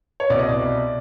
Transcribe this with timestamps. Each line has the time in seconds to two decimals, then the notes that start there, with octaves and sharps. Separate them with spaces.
0.20 C#5
0.30 C2 B2 D5
0.39 D#5
0.49 D5